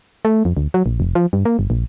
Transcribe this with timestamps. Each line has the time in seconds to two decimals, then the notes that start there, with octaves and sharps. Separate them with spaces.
0.25 A3
0.45 F2
0.57 D2
0.74 F#3
0.86 A#1
1.00 F1
1.15 F3
1.33 G2
1.45 A#3
1.59 G1
1.70 A#1